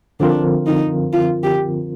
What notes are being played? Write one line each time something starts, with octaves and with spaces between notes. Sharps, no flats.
D3 F3 C4 D4 F4 A#4
D#4
F4
G4